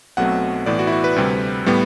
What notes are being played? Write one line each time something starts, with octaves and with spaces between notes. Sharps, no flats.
B1 B2 F#3 A3 C4 F#5
A2 E3 B3 D5
F#4
E4
F#4
B4
D2 C3 G3 C4
A2 G3 B3